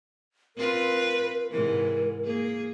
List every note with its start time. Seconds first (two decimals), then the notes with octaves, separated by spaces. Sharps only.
0.57 C4 F4 A#4 B4
1.51 G#2 C3 E3 A#4
2.25 A#3 G#4